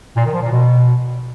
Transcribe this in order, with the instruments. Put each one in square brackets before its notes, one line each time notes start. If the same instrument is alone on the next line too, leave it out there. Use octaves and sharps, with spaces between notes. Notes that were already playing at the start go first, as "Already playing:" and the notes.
[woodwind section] A#2
D#3
F3
A#2
B2